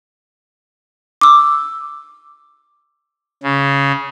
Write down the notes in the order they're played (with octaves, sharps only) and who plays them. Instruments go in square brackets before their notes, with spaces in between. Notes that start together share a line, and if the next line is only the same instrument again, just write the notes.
[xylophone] D6 E6
[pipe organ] C#3